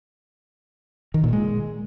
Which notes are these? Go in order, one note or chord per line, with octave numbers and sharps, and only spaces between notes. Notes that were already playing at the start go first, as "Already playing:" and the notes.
D#3
A#2
G#3